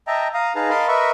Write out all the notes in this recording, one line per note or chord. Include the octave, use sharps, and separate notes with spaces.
D#5 E5 G5 A5 A#5
F5 A#5 D#6
D#4 G#4 B4 F5 A5 A#5
A#4 D#5 F5 A5 B5 C6
A#4 B4 D#5 E5 B5 C#6